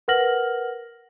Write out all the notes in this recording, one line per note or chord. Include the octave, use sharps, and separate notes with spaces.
A#4 B4 F#5 F6 A#6 F#7